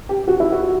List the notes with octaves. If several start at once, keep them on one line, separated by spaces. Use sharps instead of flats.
G4
F#4
E4
F#4